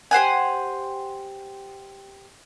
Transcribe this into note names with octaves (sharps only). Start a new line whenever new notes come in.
G4 C5 F#5 G#5